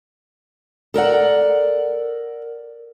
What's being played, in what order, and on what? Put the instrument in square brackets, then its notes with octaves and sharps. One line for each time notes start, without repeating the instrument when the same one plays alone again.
[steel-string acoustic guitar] A4 A#4 D5 F#5